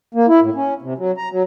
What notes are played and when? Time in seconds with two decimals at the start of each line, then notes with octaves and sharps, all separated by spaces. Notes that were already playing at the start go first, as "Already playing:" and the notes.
0.15 A#3
0.28 E4
0.41 A2
0.55 C#4
0.82 C3
0.98 F#3
1.17 A#5
1.32 F#3